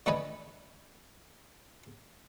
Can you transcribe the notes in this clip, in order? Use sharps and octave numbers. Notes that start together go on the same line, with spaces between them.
D3 A3 C#4 B4 D#5 G#5